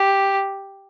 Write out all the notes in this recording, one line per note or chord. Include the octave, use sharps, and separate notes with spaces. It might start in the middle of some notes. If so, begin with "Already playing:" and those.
Already playing: G4